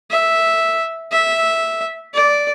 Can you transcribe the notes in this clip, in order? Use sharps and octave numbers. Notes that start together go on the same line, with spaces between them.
E5
E5
D5